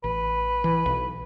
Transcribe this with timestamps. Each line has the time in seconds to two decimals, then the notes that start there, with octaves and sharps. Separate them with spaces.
0.04 A1 B4
0.64 E3
0.86 B1